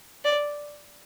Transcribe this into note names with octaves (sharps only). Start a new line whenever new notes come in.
D5